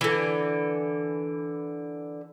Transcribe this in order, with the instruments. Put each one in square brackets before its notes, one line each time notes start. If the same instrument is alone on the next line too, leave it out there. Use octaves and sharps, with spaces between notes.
[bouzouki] D3 E3